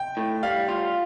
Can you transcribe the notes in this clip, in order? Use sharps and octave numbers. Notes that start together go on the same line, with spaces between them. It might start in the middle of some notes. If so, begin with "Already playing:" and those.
Already playing: G5
A2
G3 F5
F4